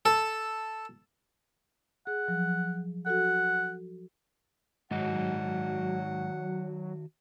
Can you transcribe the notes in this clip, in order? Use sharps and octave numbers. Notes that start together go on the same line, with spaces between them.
A4
G#4 F#5
F3 F#3
F#4 A4 F#5
G#2 D#3 F#3 F#4 D#5 F#5